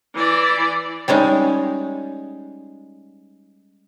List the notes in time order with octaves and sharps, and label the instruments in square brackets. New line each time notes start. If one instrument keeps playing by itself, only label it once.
[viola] E3 D5
[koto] G3 G#3 C#4 D#4